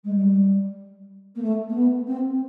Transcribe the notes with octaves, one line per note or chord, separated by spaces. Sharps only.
G#3
G3
A#3
A3
A#3
B3
C4